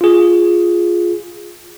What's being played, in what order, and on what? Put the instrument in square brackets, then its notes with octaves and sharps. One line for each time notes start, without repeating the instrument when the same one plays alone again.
[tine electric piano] F4 G#4